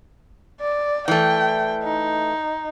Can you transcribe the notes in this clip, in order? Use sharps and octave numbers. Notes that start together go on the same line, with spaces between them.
D5
E3 A3 G5
D#4